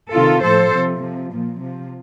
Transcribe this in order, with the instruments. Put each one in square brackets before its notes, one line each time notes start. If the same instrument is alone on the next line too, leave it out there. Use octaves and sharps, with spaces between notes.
[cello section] C3 D#3 F4 A4
A2 F3 A4 C5
C3 F3
C3 F3
A#2 F3
C3 F3